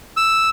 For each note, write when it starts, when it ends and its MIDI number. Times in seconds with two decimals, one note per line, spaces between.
0.17 0.50 88